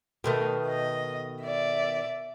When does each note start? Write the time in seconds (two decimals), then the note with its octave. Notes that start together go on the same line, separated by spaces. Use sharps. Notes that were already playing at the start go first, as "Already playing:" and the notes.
0.24 B2 D#3 A3
0.66 D#5
1.42 D5 E5